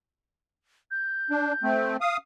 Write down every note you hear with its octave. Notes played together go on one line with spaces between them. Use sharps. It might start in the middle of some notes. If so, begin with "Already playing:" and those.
G6
D4
A3 C4
F5 D#6